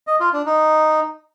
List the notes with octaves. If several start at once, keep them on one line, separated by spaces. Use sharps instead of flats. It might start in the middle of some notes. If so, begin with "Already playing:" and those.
D#5
F4
D4
D#4